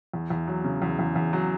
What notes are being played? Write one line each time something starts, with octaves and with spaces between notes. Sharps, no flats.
E2
E2
F#3
C#3
E2
E2
E2
F#3